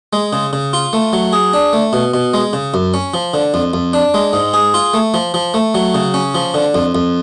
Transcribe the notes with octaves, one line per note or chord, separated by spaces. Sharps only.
G#3
C#3
C#3
F4
A3
F#3
G#4
D4
A3
B2
B2
G#3
C#3
F#2
C#4
F3
D3
F2
F2
D4
G#3
G#2
G#4
F4
A3
F3
F3
A3
F#3
C#3
C#4
F3
D3
F2
F2